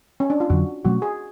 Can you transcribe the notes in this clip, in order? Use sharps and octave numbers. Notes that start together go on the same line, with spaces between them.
C#4
D4
F4
F2 D3 F#3 F#4
B2 F#3 A3 C#4 F#4
G#4